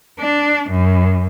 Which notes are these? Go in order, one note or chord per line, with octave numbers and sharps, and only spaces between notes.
D4
F#2